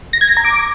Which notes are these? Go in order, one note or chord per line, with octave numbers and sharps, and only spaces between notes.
A#6
G#6
A#6
A#5
D6